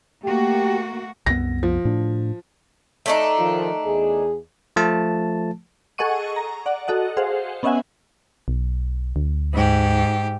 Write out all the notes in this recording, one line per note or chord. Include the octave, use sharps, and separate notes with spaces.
A3 A#3 F#4 G4
C2 F#2 B3 A#6
F3
A2 D4
A3 D4 D#4
D#3 F3
E2 G#4
F3 A3 A5
G#4 A4 D#5 F#5 C#6 D#7
A#5
D5 F#5
F#4 A4 D#5 F#5
G#4 C5 F5 F#5
B3 C#4 D#5 E5 F#5 G#5
B1
D2
G#2 G4